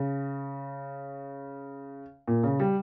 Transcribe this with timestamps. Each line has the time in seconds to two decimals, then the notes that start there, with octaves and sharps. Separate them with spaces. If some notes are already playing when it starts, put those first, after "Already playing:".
Already playing: C#3
2.28 A#2
2.43 C#3
2.60 G3